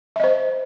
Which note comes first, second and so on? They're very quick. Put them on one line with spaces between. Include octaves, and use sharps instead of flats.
E5 D#5 C5